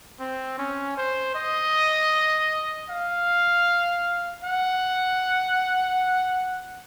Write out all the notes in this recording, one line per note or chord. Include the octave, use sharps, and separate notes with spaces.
C4
C#4
C5
D#5
F5
F#5